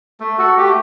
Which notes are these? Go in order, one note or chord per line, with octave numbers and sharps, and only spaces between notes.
A3
F#4 A4
A3 G4